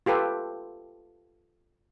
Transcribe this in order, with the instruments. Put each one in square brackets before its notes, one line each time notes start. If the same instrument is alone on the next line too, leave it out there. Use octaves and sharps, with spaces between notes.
[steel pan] F4 G4 A4 B4